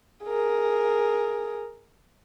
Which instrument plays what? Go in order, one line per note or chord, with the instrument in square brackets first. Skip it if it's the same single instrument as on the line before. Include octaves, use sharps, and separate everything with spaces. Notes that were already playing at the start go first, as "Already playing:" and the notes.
[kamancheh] G#4 A#4